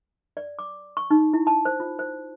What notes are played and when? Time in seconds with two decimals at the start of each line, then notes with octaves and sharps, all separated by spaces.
0.37 D5
0.59 D6
0.97 C#6
1.11 D#4
1.34 E4
1.47 A5
1.65 C5
1.80 F4
1.99 C5